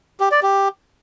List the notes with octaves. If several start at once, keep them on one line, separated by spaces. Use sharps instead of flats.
G4
D5
G4